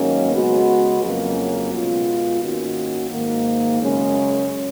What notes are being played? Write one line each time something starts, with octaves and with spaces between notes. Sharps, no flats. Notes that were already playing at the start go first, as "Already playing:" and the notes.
Already playing: G#2 D#3 F#3 A#3 C#4
C#3 G#3 B3 F#4
F2 C#3 F#3 A#3 C#4
B2 G#3 B3 F4
G#2 D#3 A#3 C#4 F#4
G#2 D#3 A#3
F#2 C#3 G#3 C#4